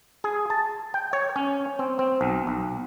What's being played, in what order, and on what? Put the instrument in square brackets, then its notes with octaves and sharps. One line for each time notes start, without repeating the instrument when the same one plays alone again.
[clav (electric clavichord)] G#4
A5
G5
C#5
C#4
C4
C4
B1
B1